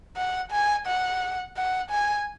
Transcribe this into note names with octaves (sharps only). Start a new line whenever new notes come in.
F#5
G#5
F#5
F#5
G#5